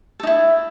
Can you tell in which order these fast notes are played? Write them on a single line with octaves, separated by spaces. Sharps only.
A4 D#4 E4